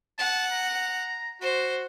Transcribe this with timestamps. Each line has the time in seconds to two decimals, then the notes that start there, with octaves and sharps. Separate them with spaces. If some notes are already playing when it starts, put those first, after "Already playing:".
0.19 F#5 A5
0.52 A#5
1.42 F#4 C5